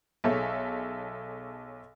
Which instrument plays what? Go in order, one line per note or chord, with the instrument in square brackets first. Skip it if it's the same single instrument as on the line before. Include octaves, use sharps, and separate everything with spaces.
[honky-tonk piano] B1 G#4 A4 C#5 E5